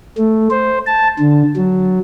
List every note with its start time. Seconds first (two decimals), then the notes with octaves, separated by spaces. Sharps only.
0.18 A3
0.50 C5
0.86 A5
1.20 D3
1.56 F#3